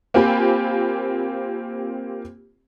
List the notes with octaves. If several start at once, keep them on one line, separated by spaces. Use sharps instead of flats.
A#3 C4 F4 G4 G#5 B5